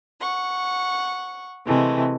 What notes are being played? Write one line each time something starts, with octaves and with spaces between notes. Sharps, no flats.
F#5 C#6
C3 E3 G#3 A3